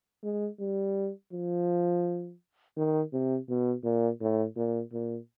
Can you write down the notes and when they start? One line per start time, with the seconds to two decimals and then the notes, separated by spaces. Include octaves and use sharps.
0.24 G#3
0.60 G3
1.33 F3
2.77 D#3
3.13 C3
3.49 B2
3.84 A#2
4.21 A2
4.57 A#2
4.93 A#2